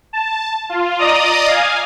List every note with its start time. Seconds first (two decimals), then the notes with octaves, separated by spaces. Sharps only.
0.13 A5
0.69 F4
0.99 D5 D#5 A#5 D#6
1.47 F5 G#5